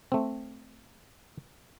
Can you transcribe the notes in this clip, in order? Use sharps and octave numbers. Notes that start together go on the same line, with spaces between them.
A3 C4